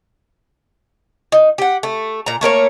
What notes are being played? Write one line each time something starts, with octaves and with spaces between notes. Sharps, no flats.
D#4
G4 F#5
A3
A#2 A#5
A3 A#3 A#4 C#5